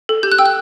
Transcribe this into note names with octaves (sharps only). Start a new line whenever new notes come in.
A4
G4 G6
F#6
G5 E6
F#6